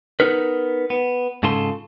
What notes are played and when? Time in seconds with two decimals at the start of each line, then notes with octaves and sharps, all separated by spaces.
0.20 B3 D#4 A#4 B4
0.90 B3
1.43 G#2 C#3 F4 A4 C6